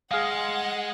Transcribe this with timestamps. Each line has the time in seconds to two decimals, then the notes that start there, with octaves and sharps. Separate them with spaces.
0.11 G#3 G#4 F5 F#5